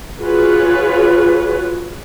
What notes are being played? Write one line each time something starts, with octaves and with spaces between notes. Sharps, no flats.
F4 F#4 G#4 B4 C#5